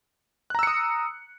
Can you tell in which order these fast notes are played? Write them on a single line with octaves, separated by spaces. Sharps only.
F#6 A#5 E6 C#7 D#6